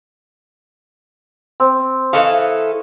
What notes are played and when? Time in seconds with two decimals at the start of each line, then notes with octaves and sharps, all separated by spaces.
1.60 C4
2.13 E3 A4 D#5 F5 C#6